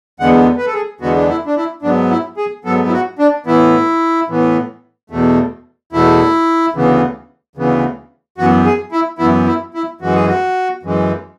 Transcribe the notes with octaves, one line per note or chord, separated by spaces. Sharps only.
E2 D3 G#3 B3 F#5
B4
A4
G#4
E2 D3 G#3 B3 F#4
D4
E4
D4
E4
G#2 F#3 B3 D4
E4
G#4
G#2 F#3 B3 A4
E4
F#4
D4
A2 E3 B3 E4
A2 E3 B3
E2 B2 A3
E2 B2 A3 E4
D2 C#3 E3 B3
D2 C#3 E3 B3
F#2 E3 B3 F#4
G#4
E4
F#2 E3 B3 E4
E4
E4
F#2 E3 G#3 F#4
G#4
F#4
F#2 E3 G#3